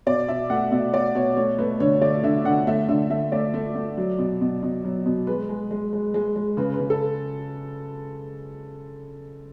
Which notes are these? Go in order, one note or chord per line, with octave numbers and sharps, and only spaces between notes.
B2 D5
B2 E5
A3 F#5
B2 E5
B2 D5
B2 C#5
A3 C#5
A3 B4
D3 C#5
A3 D5
D3 E5
D3 F#5
A3 E5
D3 E5
A3 E5
A3 D5
A3
A3
F#3
B2
B2
B2
F#3
B2
G#3 B4
G#3
G#3
G#3
G#3
G#3
C#3 B4
B4
C#3
A4